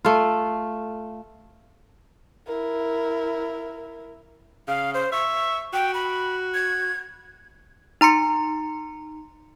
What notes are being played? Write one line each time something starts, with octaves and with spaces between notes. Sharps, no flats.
A3 F4
E4 A#4
C#3 F5
C5
E5 C#6
F#4 G5
B5
G#6
D#4 A#5 C6 C#7